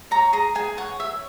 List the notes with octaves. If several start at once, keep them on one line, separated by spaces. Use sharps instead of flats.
C#5 A#5
G#4 A#5
G#4 G#5
C#5 F#5
C#5 E5